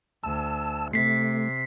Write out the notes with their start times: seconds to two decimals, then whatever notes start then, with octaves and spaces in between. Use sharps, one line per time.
0.23 D2 A5 E6
0.93 C3 A3 B6 C7